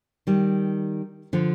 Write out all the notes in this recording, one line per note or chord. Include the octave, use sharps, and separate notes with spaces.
D#3 G3
D3 F3